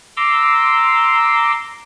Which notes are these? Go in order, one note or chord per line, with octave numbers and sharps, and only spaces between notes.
A#5 C6 D6 E6